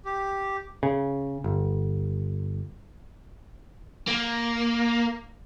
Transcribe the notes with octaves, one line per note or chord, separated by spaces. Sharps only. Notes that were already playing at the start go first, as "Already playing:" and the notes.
G4
C#3
G1
A#3